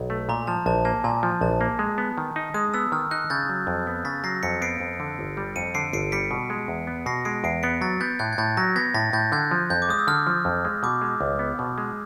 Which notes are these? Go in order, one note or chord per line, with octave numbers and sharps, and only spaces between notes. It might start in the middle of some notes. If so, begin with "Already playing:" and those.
Already playing: B1
A3
A#2 A#5
F3 A5
A#1 A5
A#3 G#5
A#2 G#5
F3
A#1 A5
A#3
G#3
B3
D#3
D#4
G#3 D#6
B3 E6
D#3 F6
D#4 F#6
C#3 G6 A6
F#3
F2
B3
C#3 A6 B6
F#3 A#6 C7
F2 B6 C#7
B3 C7 D7
F2
D3
G1
G3
F2 C#7 D#7
D3 C7 D7
G1 C7 D7
G3 B6 C#7
B2
G#3
E2
B3
B2 A#6 C7
G#3 C7 D7
E2 C7 D7
B3 B6 C#7
F#3 A6 B6
B3 G6 A6
A2 F#6 G#6
G#6
A2 G6 A6
F#3 G#6 A#6
B3 G#6 A#6
A2 A6 B6
A2 G6 A6
D3 F#6 G#6
F3
F2 G6
D6
G#3 D#6
E6
D3 F6
F3
F2
G#3
B2 D6
G#3
C#2
B3
B2
G#3